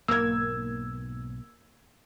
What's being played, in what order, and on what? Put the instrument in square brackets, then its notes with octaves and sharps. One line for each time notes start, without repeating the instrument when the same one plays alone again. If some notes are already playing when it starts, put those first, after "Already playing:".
[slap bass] B1 G#2 B2 [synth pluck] A#3 A#4 [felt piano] E6 G#6